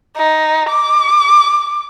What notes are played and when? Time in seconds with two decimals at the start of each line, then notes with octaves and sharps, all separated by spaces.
0.17 D#4
0.69 D6